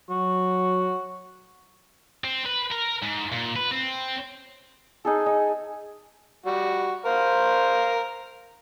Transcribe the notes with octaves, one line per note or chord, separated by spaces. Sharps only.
F#3 F#4
C4
B4
A#4
G#2
A#2
B4
C4
D#4 G#4 A4 G#5
D#4
G3 F#4
A#4 C5 F5